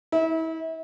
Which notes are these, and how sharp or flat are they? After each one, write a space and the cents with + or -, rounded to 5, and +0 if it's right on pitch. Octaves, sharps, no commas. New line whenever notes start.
E4 -35